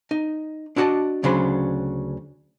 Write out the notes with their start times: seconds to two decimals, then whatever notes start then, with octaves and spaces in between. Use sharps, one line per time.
0.11 D#4
0.76 D4 E4 F#4 D5 D#5 A5
1.23 D2 C#3 F#3 D4 C5 B5